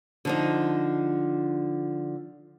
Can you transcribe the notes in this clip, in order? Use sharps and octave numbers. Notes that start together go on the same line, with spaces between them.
D3 F3 D#4